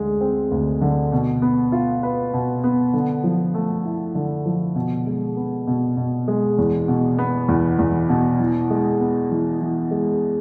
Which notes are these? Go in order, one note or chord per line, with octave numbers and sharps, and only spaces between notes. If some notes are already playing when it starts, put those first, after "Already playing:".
Already playing: D2 D3 G#3
C4
D2
D3
B2
B3
F4
B4
B2
B3
D3
F3
A3
E4
D3
F3
B2
G#3
B3
B2
B2
G#3
E2
B2
B3
E2
E2
B2
E3
G#3
B3
E3
E3
G#3